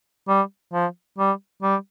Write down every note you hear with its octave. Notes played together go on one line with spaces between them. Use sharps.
G3
F3
G3
G3